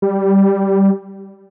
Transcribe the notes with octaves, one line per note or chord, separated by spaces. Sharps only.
G3